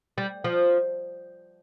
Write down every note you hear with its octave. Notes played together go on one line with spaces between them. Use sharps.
G3
F3